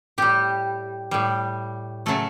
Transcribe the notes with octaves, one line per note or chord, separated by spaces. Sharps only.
A2 G3 G4
A2 G3
C#3 F#3 A3 A4